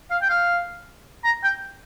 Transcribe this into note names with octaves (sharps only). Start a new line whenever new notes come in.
F5
G5
F5
A#5
G5